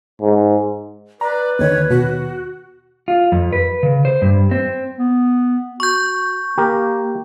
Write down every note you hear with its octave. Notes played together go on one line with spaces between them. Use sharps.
G#2
B4 D5 A#5
D#2 D3 D#3 C#5
B2 F#4
F4
F2
B4
C#3
C5
G2
C4
B3
F#4 C#6 G6
A#3 G4 A#4